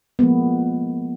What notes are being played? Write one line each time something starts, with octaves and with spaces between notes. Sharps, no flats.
F3 G#3 A#3 B3